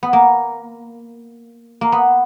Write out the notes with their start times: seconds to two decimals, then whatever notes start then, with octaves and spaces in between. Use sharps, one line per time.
0.03 B3
0.13 A#3
1.81 A#3
1.92 B3